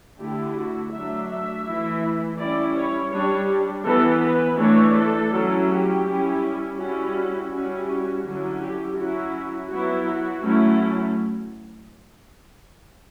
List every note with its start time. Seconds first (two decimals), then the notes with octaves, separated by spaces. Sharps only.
0.19 D3 A3 E4 G4
0.55 F#4
0.92 F#3 A3 D4 E5
1.28 E5
1.65 E3 A3 E4
2.38 G3 C#4 E4 D5
2.74 C#5
3.11 G3 D4 C#5
3.85 E3 B3 E4 A4
4.20 B4
4.58 E3 A3 D4 C#5
4.95 A4
5.31 F#3 C#4 E4
5.68 G4
6.04 G3 C#4 E4
6.77 G3 C#4 E4 F#4
7.13 F#4
7.50 G3 C#4 E4 F#4
7.86 F#4
8.23 D3 F#3 C#4 E4
8.60 G4
8.97 F#3 C#4 E4 F#4
9.70 F#3 B3 E4 F#4
10.07 F#4
10.43 F#3 A3 C#4 E4